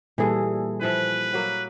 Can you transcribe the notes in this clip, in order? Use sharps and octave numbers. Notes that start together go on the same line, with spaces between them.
A#2 E3 G3 G#4 A4
E3 F3 B4 E5
F#3 A#3